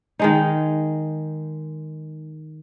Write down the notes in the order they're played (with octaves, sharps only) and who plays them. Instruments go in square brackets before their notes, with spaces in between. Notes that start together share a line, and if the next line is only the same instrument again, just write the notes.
[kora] D#3 G#3 D#4